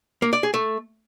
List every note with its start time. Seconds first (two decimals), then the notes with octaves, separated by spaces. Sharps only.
0.22 A#3
0.33 D5
0.43 G#4
0.54 A3